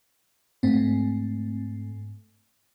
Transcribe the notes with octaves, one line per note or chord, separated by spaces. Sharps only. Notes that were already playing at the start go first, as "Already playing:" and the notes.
G#2 A3 C4